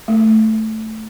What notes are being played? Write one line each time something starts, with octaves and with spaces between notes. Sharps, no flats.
A3